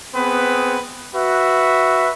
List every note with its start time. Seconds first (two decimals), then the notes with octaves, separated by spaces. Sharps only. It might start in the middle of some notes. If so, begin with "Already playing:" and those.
0.14 B3 C4 G#4 B4
1.15 F#4 B4 E5